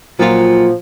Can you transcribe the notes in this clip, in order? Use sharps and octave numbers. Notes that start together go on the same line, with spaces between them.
A#2 F3 F#3 F4